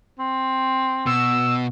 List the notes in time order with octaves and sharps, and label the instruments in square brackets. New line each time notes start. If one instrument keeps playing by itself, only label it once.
[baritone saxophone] C4
[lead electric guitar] B2 [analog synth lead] E6